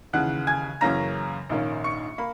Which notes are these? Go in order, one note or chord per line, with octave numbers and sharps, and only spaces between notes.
D#2 C#3 E3 F#5 F#6
G#5 G#6
F#2 C#3 E3 A#3 C#4 A#5 A#6
A#1 G#2 D#3 A#3 C#4
C#6 C#7
A#3 B5